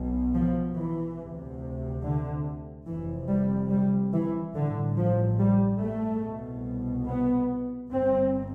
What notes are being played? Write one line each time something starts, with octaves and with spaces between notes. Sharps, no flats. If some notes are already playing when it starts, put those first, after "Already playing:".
Already playing: B1 B2
F3
E3
D2 C3
D3
F1 F2 C3 E3
G3
G3
E3
A1 G2 D3
F3
G3
A3
C2 B2
B3
G1 G2 C4